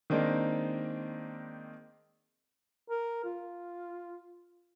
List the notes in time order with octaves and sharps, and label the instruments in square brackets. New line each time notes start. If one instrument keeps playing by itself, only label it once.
[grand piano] D#3 G#3 A#3 C4 D4 D#4
[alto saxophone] A#4
F4